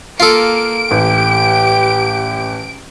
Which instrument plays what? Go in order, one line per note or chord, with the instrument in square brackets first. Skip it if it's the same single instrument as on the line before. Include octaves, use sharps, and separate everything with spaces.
[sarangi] A#3 [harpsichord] F4 A4 [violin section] D7
[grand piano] A1 [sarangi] G4